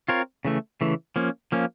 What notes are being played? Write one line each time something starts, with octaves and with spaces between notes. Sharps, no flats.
C4 F4 A#4 C#5
C#3 E3 A3
C#3 E3 A3
F3 A#3 C#4
F3 A#3 C#4